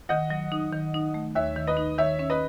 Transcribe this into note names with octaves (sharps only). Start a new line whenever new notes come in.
D#3 D#5 F#5
F#3
D#4
D#3
D#4
A3
D#2 C#5 E5
D#3
B4 D#5
D#4
D#3 C#5 E5
C#4
B4 D#5